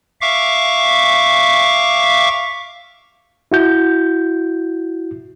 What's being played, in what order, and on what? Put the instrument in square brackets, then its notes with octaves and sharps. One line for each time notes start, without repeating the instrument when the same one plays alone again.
[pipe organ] E5 F5 C#6 D6
[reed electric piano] E4 F#4 G6